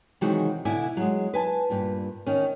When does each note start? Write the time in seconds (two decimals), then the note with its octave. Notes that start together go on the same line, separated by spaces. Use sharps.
0.21 C3 D#3 E3 F#3 G#3 F#4
0.65 B2 D3 E4 D5 E5 G#5
0.97 F#3 G#3
1.34 B4 G#5 A5
1.70 G2 A#2
2.27 D#3 C#4